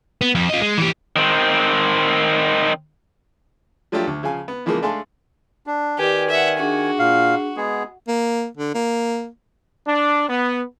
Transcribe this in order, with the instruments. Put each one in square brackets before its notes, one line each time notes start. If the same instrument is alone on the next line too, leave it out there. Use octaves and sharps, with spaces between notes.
[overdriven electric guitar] B3
F2
F4 D#5
G#3
E3 G4
[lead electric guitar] D#3 C4
[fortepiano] F3 F#3 A3 D4 F4 G4
D2
C#3 F3 F5 G#5
B3
C#3 E3 F3 G#3 A#3
G#3 A3 D4 F5 G#5 C6
[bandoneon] D4
[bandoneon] D#3 G#5 [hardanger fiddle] G4 [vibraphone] B4 D5
[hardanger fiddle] E5 F#5
[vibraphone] D4 G#4 [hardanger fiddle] F#4
[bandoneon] A#2 F5
G#3 B3 G#4
[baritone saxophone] A#3
D3
A#3
[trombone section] D4
B3